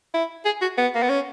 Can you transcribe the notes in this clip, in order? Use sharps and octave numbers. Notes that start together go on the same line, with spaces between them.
E4
G#4
F#4
B3
A#3
B3
C#4